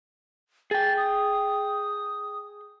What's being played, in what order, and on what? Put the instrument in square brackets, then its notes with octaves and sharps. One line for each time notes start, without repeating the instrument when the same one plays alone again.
[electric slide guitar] G#4 G5 [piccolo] A6
[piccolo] D#6